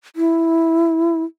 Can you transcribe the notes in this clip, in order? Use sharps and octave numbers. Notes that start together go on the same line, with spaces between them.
E4